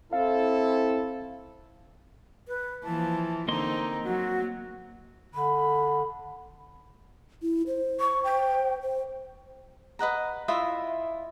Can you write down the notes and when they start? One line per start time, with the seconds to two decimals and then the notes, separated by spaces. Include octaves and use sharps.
0.13 C4 E4 A4 F5
2.48 B4
2.84 E3 F3 A#3 A5
3.48 D3 A#3 C4 D#4 D#5 A#5 C6
4.04 F#3 F#4
5.34 D3 B5
7.42 E4
7.67 C5
8.00 C#6
8.24 G5
8.81 C5
9.99 B4 D#5 F#5 A#5
10.48 E4 F4 D#5 E5